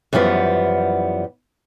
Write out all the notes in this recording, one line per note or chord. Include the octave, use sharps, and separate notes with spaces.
F#2 E3 F3 G3 B3